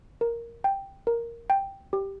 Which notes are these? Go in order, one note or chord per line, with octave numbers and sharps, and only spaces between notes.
A#4
G5
A#4
G5
G4